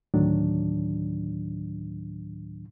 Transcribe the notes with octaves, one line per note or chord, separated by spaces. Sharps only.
D2 A2 D#3 F#3 D4